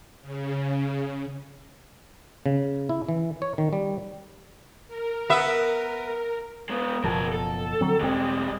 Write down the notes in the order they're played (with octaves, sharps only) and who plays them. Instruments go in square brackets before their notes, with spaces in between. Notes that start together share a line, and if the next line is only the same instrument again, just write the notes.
[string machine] C#3
[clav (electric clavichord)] C#3
E4
E3
C#5
D#3
G3
[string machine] A#4
[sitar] B3 E5
[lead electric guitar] G#3 B3
[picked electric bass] F#1 B2 F3 [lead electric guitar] G#4 A#4
[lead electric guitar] A4
[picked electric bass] D3 F#3 C4
[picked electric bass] E1 C4 [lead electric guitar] G3 G#3